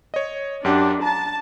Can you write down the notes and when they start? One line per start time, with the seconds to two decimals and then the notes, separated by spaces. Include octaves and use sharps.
0.14 C#5 D#5
0.65 F#2 D4 G4 F#5
1.02 A5 A#5